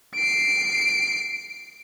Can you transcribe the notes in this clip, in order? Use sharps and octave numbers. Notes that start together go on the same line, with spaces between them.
C7 D7